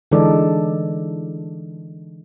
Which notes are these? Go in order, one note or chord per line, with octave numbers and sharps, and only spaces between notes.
D3 E3 G#3 D#4 A4 D5